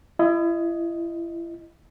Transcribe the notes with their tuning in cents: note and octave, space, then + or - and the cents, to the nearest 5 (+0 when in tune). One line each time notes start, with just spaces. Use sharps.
E4 +35 D#5 +0